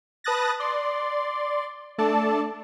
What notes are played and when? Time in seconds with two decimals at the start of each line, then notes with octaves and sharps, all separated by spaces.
0.24 B4 A5 D#6 F#6 A6 A#6
0.60 D5 C6
1.98 A3 D4 A4 D5 A5